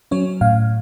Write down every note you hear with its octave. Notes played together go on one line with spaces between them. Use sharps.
F#3 C#4 C#5
A2 F5